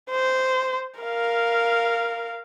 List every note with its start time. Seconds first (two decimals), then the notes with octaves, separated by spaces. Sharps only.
0.11 C5
1.00 A#4 F5